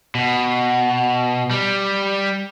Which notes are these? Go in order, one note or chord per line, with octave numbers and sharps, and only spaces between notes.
B2
G3